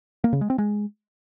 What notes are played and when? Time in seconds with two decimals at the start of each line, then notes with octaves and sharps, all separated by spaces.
0.24 A#3
0.33 C#3
0.41 G#3
0.50 C4
0.58 G#3